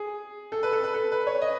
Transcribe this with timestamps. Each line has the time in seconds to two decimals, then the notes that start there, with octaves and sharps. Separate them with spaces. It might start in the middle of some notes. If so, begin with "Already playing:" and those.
Already playing: G#4
0.52 A4
0.63 B4
0.73 A4
0.84 B4
0.94 A4
1.12 B4
1.27 C#5
1.42 D#5